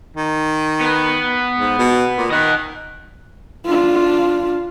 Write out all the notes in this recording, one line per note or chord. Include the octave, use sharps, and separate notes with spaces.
D#3
B3 B4
G#2
B2
A#2
D#3 D#5 F#5
D4 F4